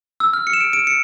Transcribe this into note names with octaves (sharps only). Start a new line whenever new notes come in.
E6
F6
C#7
E7
D7
D7
C#7